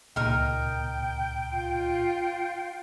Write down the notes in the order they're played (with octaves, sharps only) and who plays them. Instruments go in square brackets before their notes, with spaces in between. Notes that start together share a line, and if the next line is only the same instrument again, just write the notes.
[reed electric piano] C#2 A#2 [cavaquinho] D#4 A#4 [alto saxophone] G5
[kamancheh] F4